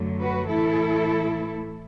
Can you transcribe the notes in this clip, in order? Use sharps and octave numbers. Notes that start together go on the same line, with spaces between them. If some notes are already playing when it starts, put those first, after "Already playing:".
Already playing: F#2 D3 F#3 A3
F#4 B4
A2 E3 A3 E4 A4